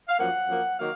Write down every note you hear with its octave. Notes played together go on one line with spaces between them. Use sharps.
F5
F#2 F3 A#3 F#5
F#2 F3 A#3
D#3 F#3 A#3 F5